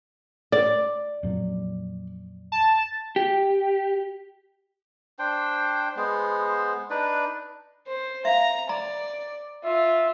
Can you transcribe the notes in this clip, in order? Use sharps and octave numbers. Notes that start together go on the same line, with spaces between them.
D5
F2 A#2 F#3
A5
G4
D4 C5 G5
G#3 B3 C5
D4 D#4 B4 D5
C5
E5 F5 A#5
D5 A#5
F4 E5